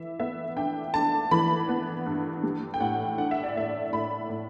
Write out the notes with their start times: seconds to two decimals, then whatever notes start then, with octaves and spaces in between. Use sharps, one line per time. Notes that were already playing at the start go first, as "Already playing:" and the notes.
Already playing: E3 E5
0.19 B3 E5
0.57 D4 G5
0.94 D4 A5
1.31 E3 B5
1.69 B3
2.06 G2
2.43 G3
2.74 G5
2.80 A2 F#5
3.18 D4 F#5
3.31 E5
3.44 D5
3.56 A2 E5
3.92 A2 B5
4.30 A2